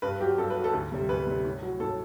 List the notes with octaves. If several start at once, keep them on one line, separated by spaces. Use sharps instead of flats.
G2 B4
F#3 G4
G2 A4
B4
F#3
A4
D2
C3 G3
D2 B4
C3 G3
A2
F#3
A2 A4